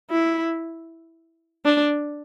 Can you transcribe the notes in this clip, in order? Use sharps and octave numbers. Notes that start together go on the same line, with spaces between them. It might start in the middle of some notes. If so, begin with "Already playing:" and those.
E4
D4